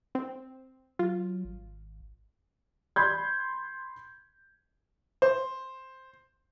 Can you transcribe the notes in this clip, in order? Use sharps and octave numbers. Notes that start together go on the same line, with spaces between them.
C4
F#3 F4
G#1
B5 C6 G6 G#6
C5